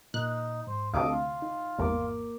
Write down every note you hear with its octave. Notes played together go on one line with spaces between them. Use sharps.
A#2 D#4 F#6
G#2 C5
D2 C3 D4 A4 D#5 F5 D6
F4
D#4
G#1 E2 A#3 A#4 D6